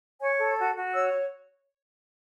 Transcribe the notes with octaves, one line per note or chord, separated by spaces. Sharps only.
C#5 G#5
A4
F#4
F#4
C#5 E6